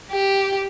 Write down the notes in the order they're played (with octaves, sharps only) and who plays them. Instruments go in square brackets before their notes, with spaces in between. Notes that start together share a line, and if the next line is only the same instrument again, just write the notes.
[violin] G4